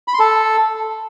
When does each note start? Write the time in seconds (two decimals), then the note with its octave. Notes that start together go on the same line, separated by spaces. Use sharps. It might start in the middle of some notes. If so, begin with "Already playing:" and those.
0.08 B5
0.14 C6
0.19 A4